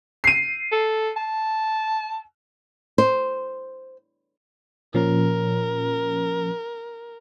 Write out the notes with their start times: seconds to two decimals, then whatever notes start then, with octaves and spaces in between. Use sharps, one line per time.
0.24 C7 D#7
0.72 A4
1.17 A5
2.98 C5
4.94 A#2 F3 C#4 A#4